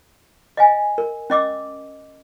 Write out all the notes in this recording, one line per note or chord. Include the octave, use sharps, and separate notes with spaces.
D#5 F5 G#5
A#4
C#4 D#5 D6 E6